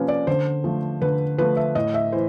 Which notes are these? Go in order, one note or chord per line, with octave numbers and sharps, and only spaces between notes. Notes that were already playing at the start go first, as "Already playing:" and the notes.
Already playing: C3 F3 A#3 C#4 A#4 B4
D5
D3 C5
F3 A3
D3 B4
F3 A3 B4
E5
A2 D#5
E5
E3 C5